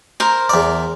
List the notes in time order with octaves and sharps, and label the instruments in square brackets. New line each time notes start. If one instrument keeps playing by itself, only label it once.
[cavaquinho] A#4 C5
[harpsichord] E2 D5